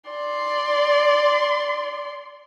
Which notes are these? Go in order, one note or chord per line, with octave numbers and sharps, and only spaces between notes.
D5 C6